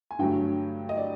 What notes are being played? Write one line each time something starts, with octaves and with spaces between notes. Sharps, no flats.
G#5
G2 D3 F#3 A3 G5
D#5
D5